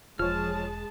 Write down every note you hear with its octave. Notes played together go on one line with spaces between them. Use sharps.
E1 F3 G#3 G#4 C#5 A5 F6